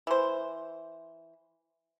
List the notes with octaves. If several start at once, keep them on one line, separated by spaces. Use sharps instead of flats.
E3 C5